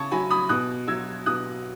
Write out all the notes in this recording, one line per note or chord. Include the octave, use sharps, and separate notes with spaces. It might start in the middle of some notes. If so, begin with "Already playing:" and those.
Already playing: C#3 A5 C#6 G#6
F#3 G#5 B5
B5 D#6
B2 D#6 F#6
F#3 E6 G#6
B2 D#6 F#6